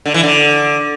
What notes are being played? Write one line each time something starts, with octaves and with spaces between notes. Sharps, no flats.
D3
E3
D3